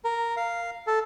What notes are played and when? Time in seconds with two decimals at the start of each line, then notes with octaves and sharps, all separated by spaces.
0.05 A#4
0.37 F5
0.87 A4